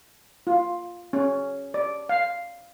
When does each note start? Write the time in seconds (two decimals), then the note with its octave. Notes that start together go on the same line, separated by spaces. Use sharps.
0.47 F4
1.13 C#4
1.74 D5
2.09 F5